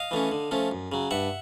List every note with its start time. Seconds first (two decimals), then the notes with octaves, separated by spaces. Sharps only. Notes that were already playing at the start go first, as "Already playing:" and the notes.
Already playing: D#5 F5
0.11 E3 A3 C#4
0.31 D3
0.51 F3 A3 C#4
0.71 F#2
0.92 C#3 F#3
1.11 G2 E5 F#5